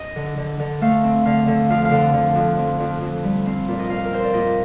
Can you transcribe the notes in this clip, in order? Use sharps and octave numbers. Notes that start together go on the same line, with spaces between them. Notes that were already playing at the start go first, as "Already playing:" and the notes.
Already playing: D#5
D3
D3
D3
A3 F5
C4
D3 F5
D3
F2 F5
F5
D3
D3
F2
F2
F2
F2
G3
C4 F5
A#2 D5
D#5
A#2 F5
A#4
C4 C5
D5
A#2 D#5